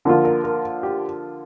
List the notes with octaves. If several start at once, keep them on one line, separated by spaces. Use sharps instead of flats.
D3 F3 A#3 F4 A#4
A#4
A#4
G4